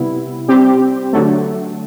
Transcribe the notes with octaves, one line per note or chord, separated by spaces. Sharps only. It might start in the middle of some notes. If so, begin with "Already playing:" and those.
Already playing: C3 G3 B3 E4
G3 C4 G4
D3 F#3 A3